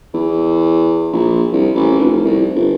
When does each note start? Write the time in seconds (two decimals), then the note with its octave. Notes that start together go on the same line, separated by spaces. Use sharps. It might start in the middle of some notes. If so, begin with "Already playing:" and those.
0.14 E2
1.12 A#1
1.52 C2
1.75 A1
1.99 F1
2.25 C2
2.55 G1